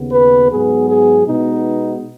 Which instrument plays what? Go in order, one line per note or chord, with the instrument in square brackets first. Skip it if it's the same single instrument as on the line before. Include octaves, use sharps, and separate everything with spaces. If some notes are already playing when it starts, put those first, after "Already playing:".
Already playing: [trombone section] D#2 C#3 B3
B4
G#2 F#3 B3 G#4
G#4
B2 G#3 B3 D#4